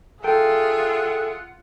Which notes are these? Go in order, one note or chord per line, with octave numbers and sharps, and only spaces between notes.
F4 G#4 A4 E5 F#5 G5